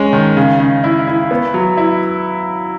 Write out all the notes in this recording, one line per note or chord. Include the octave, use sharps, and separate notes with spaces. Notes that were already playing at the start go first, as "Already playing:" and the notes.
Already playing: G#3 C#4
D#3
C#3
C#3
E4
E4
B3
F#3
E4